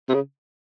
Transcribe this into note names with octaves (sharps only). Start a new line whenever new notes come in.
C3
C#3